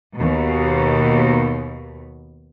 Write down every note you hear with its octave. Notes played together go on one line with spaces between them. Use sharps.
D#2 B2